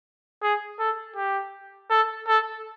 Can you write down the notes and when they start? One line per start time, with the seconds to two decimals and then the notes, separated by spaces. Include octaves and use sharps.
0.43 G#4
0.79 A4
1.16 G4
1.90 A4
2.27 A4